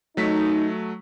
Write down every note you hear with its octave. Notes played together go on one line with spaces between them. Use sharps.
F#3 A3 D#4 B6